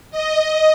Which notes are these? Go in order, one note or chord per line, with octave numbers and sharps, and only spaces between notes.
D#5